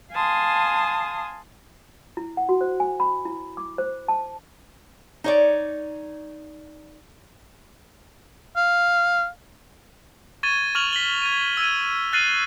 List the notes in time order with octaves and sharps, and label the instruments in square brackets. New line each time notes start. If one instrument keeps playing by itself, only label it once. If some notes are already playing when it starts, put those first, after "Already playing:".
[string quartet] F5 G#5 A5 C6 D#6
[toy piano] E4
F#5
F#4
C5
G#5
B5
E4
D6
C5
A5
[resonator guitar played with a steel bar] D#4 C#5 D5
[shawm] F5
[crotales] C#6 G#6 A6 D#7 E7 G7
C#6 F6 A6 F7 F#7
B6 F#7 G7
G#6 D#7
E6 G#6 D#7
F6 F#6 A6 C7 D#7 F#7